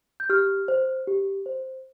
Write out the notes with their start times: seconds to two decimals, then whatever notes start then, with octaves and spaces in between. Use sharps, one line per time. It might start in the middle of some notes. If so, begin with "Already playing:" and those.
0.20 G6
0.30 G4 F6
0.68 C5
1.07 G4
1.46 C5